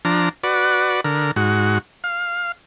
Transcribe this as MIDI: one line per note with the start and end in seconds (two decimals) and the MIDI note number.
0.05 0.29 53
0.05 0.29 62
0.05 0.29 82
0.44 1.01 66
0.44 1.01 71
0.44 1.01 74
1.05 1.31 50
1.05 1.31 70
1.36 1.78 44
1.36 1.78 66
2.04 2.52 77